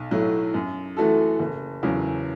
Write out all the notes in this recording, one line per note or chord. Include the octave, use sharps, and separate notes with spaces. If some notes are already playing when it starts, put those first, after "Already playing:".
Already playing: B1
A2 F#3
F#2
E3 A3 F#4 A4
F#1
E2 C#3 F#3